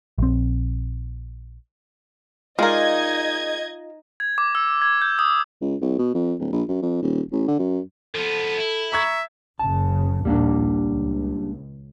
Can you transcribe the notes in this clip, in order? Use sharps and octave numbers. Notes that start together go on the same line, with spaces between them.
A#1 C4
G#3 D#4 F4 A#4 D5 D#5 F5 G#6
G#6
D6
E6
G#6
G6
D#6
C#2
C2
B2
F2
D1
A#1
F#2
F2
D#1
A1
D3
F#2
F3 B3 A4
E4
E5 A#5 C#6 G#6
F#1 C#3 A5
A#1 D#2 G3 A#3 D4
C#2